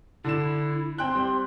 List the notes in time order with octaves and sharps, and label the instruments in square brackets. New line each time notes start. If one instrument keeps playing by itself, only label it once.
[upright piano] D3 E7 [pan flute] E4
[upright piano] C4 G5 F#6 [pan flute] C6
[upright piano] G3 C4